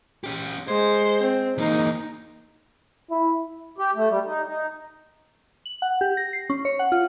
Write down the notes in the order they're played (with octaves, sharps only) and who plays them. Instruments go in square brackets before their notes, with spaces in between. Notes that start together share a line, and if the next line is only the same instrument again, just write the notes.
[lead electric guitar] C#4 G4
[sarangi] G#3 [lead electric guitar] C5
[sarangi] C4
[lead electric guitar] E2 A#3 [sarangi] D#4
[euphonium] E4
[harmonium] G4
A3
G3
D#4
D#4
[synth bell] F#7
F#5
G4
A#6
C7
C#4
C#5
F#5
F4